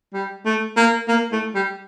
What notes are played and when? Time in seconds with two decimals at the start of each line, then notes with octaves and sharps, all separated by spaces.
0.14 G3
0.46 A3
0.77 A#3
1.08 A#3
1.32 A3
1.55 G3